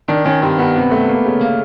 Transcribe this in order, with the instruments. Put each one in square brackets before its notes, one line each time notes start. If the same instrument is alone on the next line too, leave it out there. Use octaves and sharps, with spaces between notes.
[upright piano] D#3 [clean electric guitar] D4
[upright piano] D#3 [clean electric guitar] C#4
[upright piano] G2 [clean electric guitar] C4
[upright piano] G2 [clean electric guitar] B3
[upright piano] C3
A3
A#3
C#3
[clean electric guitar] A#3